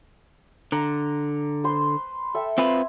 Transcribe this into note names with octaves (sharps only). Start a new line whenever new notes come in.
D3 A#5
B4 C5 C6
A4 E5 G5
C4 F4 B4 G#5